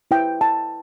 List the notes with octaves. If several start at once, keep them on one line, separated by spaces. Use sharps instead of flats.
E4 B4 G5
A5